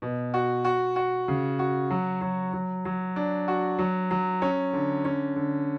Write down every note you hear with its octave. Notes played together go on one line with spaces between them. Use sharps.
B2
F#4
F#4
F#4
C#3
F#4
F#3
F#3
F#3
F#3
D4
F#4
F#3
F#3
C#4
D3
C#4
D3